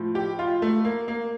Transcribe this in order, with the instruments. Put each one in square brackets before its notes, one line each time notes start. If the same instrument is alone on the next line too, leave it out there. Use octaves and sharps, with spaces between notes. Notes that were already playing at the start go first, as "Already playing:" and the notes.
Already playing: [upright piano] A2 F3
G4
F4
A3
A#3
A#3